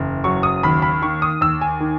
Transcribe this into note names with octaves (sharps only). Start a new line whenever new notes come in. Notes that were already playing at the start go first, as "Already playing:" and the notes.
Already playing: F#1 E2
F#3 C#6
D#6
D#2 B5
B5
D#3 C#6
D#6
D#2 E6
G#5
D#3